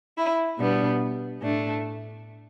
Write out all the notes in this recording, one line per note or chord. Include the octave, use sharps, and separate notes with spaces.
E4
B2 G3 B3 D4
A2 A3 D4